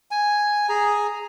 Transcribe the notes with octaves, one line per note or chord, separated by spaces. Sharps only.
G#5
G#4 A#5